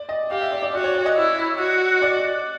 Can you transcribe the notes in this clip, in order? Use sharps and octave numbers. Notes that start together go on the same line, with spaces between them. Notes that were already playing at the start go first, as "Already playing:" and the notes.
Already playing: D5
D#5
G4 F5
E5
D5
D5
F#4 D5
C#5
D5
D#5
E4
F#4
D5